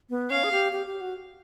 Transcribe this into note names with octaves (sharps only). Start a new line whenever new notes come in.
B3
C#4 F5
G#4
G4
G4
G4
F#4